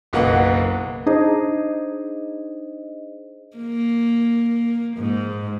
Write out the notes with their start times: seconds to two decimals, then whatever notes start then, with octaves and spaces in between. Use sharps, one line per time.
0.13 F#1 B1 A#3 B4 F#5
1.06 D4 D#4 G#4 C5 D#5
3.57 A#3
4.97 G#2